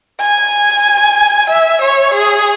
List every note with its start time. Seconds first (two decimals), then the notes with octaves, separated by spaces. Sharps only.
0.20 G#5
1.50 E5
1.82 C#5
2.14 G#4